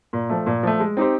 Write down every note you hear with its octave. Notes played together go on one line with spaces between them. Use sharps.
A#2
F3 A3
A#2
F3 A3
G#3
C4 D#4 G4 C5